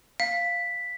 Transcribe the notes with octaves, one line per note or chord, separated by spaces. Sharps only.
F5 B6